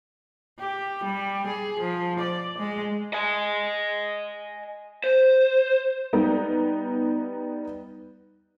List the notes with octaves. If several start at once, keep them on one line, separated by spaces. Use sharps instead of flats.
G4
G3
G#4
F3
D5
G#3
D#5 G#5
C5
G3 B3 D#4